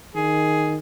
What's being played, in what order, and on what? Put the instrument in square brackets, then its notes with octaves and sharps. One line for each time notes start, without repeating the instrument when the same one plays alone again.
[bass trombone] D#3 [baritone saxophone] G#4